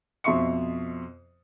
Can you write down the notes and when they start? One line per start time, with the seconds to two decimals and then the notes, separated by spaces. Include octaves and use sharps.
0.24 F2 B2 E5 C6 C#6 C#7